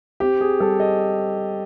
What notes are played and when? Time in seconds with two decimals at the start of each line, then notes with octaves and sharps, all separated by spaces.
0.20 C4 G4
0.41 G#4
0.60 G3 A4
0.80 D#5